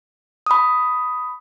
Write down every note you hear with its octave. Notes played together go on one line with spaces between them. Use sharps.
B5 D#6